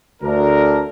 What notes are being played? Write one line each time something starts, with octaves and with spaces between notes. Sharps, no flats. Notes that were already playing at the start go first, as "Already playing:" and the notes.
D2 D4 A#4